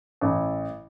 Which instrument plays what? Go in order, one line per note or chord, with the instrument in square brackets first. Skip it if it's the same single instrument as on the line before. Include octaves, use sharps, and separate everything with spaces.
[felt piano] A1